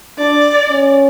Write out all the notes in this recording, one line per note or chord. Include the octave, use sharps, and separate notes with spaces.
D4 D5
C#4